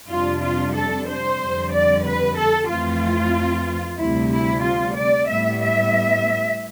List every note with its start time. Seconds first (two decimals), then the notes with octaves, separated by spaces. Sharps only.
0.10 F2 C3 G3 D4 F4
0.43 F4
0.75 A4
1.08 C5
1.40 F2 D3 G3
1.73 D5
2.05 B4
2.37 A4
2.69 F2 E3 A3 C4 F4
3.98 D2 C3 G3 E4
4.32 E4
4.63 F4
4.95 D5
5.28 A2 G3 B3 E5
5.61 E5